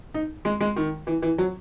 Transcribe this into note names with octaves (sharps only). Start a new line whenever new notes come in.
D#4
G#3
G#3
D#3
E3
E3
F#3